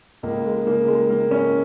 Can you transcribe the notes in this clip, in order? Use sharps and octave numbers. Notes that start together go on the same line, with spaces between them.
C#2 A#3
G#3
C#3 A#3
G#3
C#3 A#3
C#4